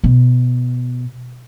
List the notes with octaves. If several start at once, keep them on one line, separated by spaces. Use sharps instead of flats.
B2